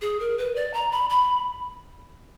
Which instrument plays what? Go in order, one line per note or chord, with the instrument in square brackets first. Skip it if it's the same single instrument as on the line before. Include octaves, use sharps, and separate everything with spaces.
[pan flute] G#4
A#4
B4
D5
A#5
B5
B5